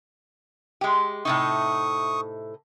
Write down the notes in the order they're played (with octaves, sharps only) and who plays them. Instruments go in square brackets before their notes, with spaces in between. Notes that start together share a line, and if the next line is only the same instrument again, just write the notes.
[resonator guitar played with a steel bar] G#3 G4
[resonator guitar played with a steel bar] A2 C3 D#4 [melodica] C#6 D#6